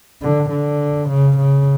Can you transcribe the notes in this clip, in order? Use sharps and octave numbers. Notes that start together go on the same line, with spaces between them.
D3
D3
C#3
C#3